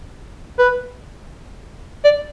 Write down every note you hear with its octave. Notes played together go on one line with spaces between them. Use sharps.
B4
D5